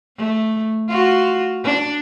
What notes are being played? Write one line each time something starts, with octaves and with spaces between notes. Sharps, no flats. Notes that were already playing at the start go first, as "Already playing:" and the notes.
A3
F4 F#4
D4